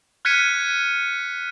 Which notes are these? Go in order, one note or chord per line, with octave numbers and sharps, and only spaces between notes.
F6 F#6 G#6 B6 C#7 D#7